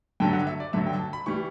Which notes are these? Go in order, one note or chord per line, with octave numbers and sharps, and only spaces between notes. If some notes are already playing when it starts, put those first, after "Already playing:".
G2 D3 F#3 G5
F#5
E5
D5
G2 D3 F#3 E5
G5
A5
B5
E3 G3 C#6